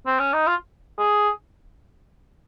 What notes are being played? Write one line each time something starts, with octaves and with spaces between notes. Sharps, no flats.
C4
C#4
D#4
F4
G#4